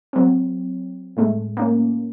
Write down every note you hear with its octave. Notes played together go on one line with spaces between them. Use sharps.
F#3 C4
A2 G#3 A3
A#3 C#4